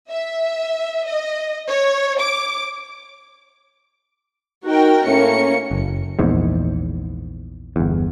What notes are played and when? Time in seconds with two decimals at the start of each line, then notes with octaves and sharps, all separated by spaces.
0.10 E5
1.06 D#5
1.69 C#5
2.20 D6
4.66 D#4 F#4 A#4 G5
5.06 A2 A#3 C#4 C#7
5.71 F#1
6.19 A#1 E2 G#2
7.76 G1 E2